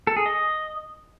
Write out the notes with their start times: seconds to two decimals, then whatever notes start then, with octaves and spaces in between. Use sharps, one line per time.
0.07 A4
0.17 G#4
0.26 D#5